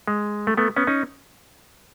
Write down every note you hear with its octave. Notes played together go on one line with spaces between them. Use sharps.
G#3
A3
A3 B3
B3 C#4
C#4 D#4